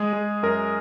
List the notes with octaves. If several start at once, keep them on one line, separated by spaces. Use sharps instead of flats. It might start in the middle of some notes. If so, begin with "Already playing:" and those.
Already playing: G#3 G#4
G#3
F#2 A#4